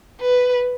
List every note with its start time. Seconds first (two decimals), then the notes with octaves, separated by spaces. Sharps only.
0.21 B4